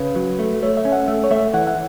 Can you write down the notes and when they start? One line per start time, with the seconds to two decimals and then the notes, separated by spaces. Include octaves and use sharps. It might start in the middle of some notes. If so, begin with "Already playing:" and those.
Already playing: C#3 B4
0.16 F#3
0.39 A3
0.63 A3 C#5
0.77 E5
0.85 C#4
0.92 F#5
1.08 A3
1.24 C#5
1.31 A3 E5
1.54 E3 F#5
1.67 F#5